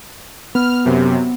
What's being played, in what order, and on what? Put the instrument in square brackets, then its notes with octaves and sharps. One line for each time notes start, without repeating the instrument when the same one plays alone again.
[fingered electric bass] B3 [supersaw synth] F6
[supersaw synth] F#2 C3